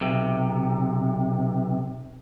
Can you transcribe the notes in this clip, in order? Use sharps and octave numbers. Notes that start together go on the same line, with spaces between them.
B1 C3